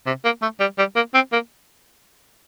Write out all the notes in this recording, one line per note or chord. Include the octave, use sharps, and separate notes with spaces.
C3
A#3
A3
G3
G3
A#3
C4
A#3